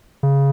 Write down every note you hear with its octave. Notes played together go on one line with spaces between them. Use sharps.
C#3